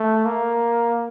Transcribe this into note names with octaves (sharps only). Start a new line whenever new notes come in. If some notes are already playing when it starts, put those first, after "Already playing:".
Already playing: A3
A#3